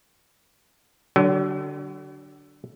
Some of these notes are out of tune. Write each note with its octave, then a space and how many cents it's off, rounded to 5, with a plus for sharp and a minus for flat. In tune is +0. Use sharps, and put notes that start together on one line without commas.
D3 +0 F#3 +35